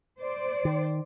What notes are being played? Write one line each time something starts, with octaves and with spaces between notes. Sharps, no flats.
C5 D5
D#3